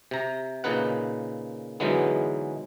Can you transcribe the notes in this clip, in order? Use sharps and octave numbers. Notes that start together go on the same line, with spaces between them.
C3 A#5
A#2 C#3 D#4 B4 F#5
G#2 D3 E3 F#3 G#3 B3